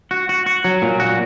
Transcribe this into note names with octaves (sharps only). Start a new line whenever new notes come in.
F#4
F#4
F#4
F#3
A#2
F#4